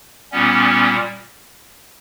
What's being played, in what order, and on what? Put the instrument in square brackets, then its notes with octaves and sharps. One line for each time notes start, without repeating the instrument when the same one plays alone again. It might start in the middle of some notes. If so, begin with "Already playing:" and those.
[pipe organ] A#2 G3 B3 C#4